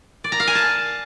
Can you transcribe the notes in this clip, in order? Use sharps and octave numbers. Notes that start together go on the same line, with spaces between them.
D5
A#5
F5
G#5
A5